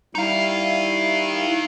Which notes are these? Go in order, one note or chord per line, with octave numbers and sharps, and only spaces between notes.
G3 D#4 E4 F5